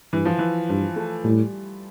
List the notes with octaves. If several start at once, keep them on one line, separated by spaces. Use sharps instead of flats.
G2 E3
F3
E3
G2 F3
A3
A2 G3